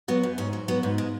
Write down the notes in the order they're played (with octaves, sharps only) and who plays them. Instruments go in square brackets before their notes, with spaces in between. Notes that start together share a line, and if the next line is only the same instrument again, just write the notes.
[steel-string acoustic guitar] F#3 B3
F#2
G#2 C#4
F#3
F#3 B3
G#2
G#3